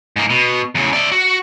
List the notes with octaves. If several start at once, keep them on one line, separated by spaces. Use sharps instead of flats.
G#2 A#3
B2
E2 C#3
D5 E5
F#4